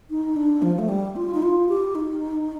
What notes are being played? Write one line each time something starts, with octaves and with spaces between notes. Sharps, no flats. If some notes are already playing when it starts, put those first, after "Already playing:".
D#4
D4
F3
A3
G3
F4
D#4
F4
G4
D#4